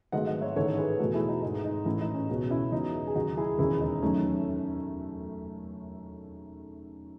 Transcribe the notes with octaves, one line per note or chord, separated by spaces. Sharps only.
G#1 G#2 F#3 A3 D#5 F#5
D#5 F#5
C#5 E5
A1 G#2 D#3 A4 C#5
A4
G#4 B4
E2 B2 A3 F#4 A4
E4 G#4
D#4 F#4
G#1 G#2 D#3 G#3 D#4
D#4
A1 A2 E3 A3 C#4 E4
D#4
C#4
C#2 B2 G#3 C#4
C#4 E4
E2 B2 G#3 D#4
G#4
D#2 C#3 F#3 D#4 F#4
E4 G#4
E1 D#2 D#3 G#3 C#4 E4
D#4
F#2 D#3 A3 C#4